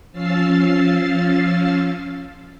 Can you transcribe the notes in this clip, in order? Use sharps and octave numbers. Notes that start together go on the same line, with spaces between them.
F3 C#4 F5 E6 A6 C7